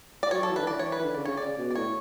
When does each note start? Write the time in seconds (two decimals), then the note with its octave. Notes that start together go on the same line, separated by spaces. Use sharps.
0.23 D5
0.31 F#3 C#5
0.41 F#3 A4
0.50 E3
0.56 D3 B4
0.67 E3 D5
0.79 C#5
0.92 B4
1.00 E3
1.03 D3
1.15 C#3 D5
1.25 C#3 C#5
1.37 C#3 D5
1.58 B2
1.71 D5
1.75 A2 C#5